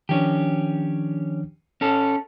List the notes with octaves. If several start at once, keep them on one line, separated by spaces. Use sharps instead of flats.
D#3 F3 C#4 D4 G4
C#4 A4